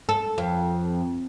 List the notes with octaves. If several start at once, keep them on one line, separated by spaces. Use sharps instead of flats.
A4
F2